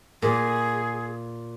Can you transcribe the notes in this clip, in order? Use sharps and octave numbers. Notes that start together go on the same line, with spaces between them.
A#2 G#4